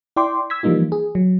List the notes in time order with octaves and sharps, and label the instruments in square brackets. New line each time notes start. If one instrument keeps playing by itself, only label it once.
[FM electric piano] E4 D5 G5 C6 D6
E6 G#6 B6
E3 F3 G3 A#3 D#4 F4
G#4
F#3